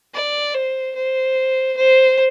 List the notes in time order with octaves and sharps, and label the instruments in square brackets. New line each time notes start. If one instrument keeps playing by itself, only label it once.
[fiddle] D5
C5
C5
C5